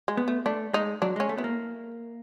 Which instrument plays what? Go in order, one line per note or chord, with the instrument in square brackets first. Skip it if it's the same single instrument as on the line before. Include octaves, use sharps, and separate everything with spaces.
[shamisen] G#3
[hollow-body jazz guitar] B3
[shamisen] A3
[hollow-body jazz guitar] A3 [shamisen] D4
[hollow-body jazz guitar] G#3 [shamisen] D#4
[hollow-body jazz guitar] F#3 [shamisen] D4
[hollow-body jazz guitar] G#3 [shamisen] C#4
[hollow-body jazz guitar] A3
[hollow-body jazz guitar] B3 [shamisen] E4
[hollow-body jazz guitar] A#3